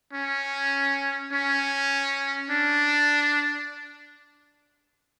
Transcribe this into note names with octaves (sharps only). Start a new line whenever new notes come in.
C#4
C#4
D4